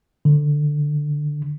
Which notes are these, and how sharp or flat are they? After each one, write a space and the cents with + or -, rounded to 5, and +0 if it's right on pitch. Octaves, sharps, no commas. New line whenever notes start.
D3 +10